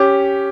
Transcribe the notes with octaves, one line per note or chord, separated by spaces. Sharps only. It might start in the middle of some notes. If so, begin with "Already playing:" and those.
Already playing: C#4 G4